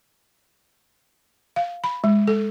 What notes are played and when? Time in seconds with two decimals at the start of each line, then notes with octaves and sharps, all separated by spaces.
1.56 F5
1.84 B5
2.04 G#3
2.27 A4